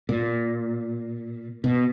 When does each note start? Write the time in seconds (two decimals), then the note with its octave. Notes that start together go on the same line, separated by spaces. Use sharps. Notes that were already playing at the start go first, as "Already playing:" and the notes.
0.09 A#2
1.64 B2